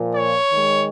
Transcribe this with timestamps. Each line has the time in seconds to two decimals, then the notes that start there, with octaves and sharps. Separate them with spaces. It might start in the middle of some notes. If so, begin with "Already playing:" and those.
Already playing: A#2 F3 A#3
0.14 C#5
0.49 D#3 G#3